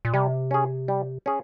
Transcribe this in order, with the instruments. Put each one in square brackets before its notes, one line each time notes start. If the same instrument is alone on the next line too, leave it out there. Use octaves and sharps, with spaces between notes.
[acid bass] A#2
[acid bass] C3 [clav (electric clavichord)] G3
[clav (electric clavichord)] C#4 G#4
G3
C#4 G#4